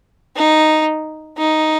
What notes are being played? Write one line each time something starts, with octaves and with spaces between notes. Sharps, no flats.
D#4
D#4